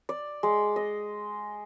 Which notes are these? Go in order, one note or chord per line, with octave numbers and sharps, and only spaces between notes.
D5
G#3
D#5